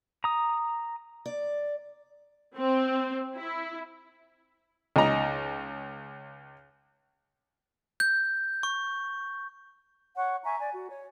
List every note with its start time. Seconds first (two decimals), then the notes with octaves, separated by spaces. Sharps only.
0.24 A#5 D#6
1.26 D5
2.57 C4
3.34 E4
4.96 C#2 D#4 A#5
8.00 G6
8.63 C#6
10.15 C#5 F#5 C#6
10.44 E5 G#5 A#5 C#6
10.59 D5 G#5
10.74 F#4
10.89 C#5